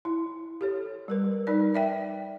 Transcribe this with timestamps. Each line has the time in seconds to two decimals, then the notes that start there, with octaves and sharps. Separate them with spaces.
0.05 E4
0.61 G4 A4 C#5
1.08 G3 A#4 B4
1.47 G3 D#4 A#4 D5
1.74 D5 E5 G5